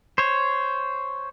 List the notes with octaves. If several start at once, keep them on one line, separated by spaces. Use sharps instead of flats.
C5 C#5